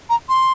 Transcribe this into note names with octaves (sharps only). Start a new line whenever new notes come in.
A#5
C6